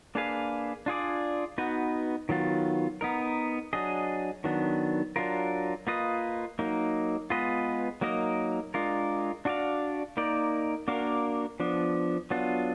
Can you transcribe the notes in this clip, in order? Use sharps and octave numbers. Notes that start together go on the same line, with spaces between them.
A#3 D4 G#4 B4 F5
D4 F4 G#4 D5
B3 D#4 F#4 B4
D#3 F#3 B3 F4
B3 D#4 A#4
F#3 D4 G#4 D#5
D#3 F#3 B3 D4
F#3 D4 F4 A#4
A#3 F4 B4 D#5
F#3 A#3 D#4
G#3 B3 F4 B4 D#5
F#3 A#3 D#4 A#4 D#5
G#3 D4 F4 A#4
D4 F#4 D5 F5
A#3 D#4 A#4 D5
A#3 D4 F#4 A#4 F5
F3 B3 D4
F#3 B3 D4 F4